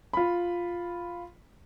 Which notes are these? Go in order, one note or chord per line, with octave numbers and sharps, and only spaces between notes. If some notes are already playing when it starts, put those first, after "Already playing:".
F4 B5